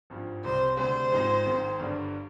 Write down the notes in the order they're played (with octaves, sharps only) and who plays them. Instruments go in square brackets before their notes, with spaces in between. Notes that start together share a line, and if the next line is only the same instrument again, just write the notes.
[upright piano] G#1 G2 F3
[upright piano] C2 C3 G3 [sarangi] C5
[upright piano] D2 C3 G3 D4 G#4 [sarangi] C5
[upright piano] G#1 G#2 F3 G#3 D#4
G#1 G#2 D#3
G1 G2 D3 G3 D4